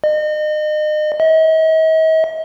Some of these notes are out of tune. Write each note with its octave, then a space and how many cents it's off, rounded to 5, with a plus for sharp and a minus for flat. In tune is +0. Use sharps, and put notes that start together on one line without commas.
D#5 -35
D#5 +45